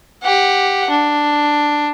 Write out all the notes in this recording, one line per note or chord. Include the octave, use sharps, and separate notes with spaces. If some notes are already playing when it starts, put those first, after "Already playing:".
G4 F#5
D4